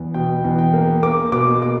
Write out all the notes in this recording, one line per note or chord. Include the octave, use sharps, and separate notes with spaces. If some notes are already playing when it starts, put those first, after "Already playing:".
Already playing: E2
B2 G5
E2
G5
A#3
A#3 D6
B2 D6
A#3 D6